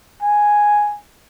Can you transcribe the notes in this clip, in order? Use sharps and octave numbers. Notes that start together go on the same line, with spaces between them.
G#5